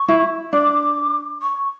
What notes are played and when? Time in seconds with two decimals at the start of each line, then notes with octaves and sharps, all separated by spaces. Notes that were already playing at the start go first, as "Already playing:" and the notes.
Already playing: C#6
0.08 E4
0.53 D4 D6
1.42 C#6